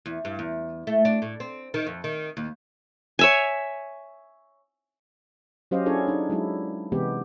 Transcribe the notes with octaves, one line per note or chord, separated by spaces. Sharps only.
E2
G2
E2
A3
D4
A2
C4
D#3
F2
D#3
D#2
C#5 E5 G#5
F#3 C#4 G4 C5 D#5 F5
C#4 D4 E4 G#4 A4 C#5
D4 D#4
F#3 G#3 E4
C3 E3 G#3 B3 G4